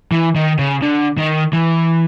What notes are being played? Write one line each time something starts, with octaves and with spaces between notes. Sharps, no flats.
E3
D#3
C#3
D3
D#3
E3